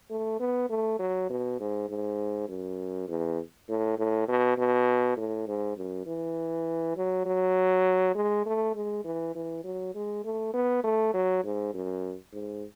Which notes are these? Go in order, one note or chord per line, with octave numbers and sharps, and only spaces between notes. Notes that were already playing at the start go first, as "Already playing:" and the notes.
A3
B3
A3
F#3
B2
G#2
G#2
F#2
E2
A2
A2
B2
B2
A2
G#2
F#2
E3
F#3
F#3
G#3
A3
G#3
E3
E3
F#3
G#3
A3
B3
A3
F#3
G#2
F#2
G#2